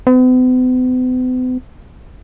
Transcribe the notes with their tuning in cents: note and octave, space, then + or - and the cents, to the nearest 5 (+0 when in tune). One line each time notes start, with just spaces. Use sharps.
B3 +45